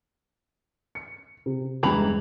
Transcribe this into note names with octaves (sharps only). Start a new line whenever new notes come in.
C#7
C3
E2 G2 E3 G#3 A#5 B5